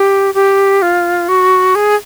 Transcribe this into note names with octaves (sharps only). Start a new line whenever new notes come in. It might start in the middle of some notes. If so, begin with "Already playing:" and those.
Already playing: G4
G4
F4
F#4
G#4